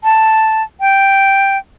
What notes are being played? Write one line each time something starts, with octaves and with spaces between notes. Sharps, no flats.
A5
G5